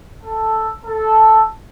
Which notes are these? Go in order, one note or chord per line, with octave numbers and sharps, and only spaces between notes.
A4
A4